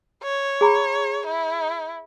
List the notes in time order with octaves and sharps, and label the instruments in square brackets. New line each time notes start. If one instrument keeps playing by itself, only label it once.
[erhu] C#5
[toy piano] G#4 A#5 B5
[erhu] E4